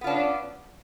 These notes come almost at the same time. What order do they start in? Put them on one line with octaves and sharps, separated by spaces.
B3 F4 D4 C#4